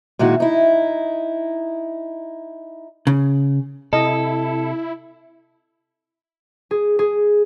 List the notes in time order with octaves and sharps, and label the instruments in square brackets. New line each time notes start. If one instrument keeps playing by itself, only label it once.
[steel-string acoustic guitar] A#2 D#3 G#3 E4 F#4
D#4 E4
[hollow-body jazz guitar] C#3
[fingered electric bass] C3 [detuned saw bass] E4 [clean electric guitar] A4 [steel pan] D#5
[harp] G#4
G#4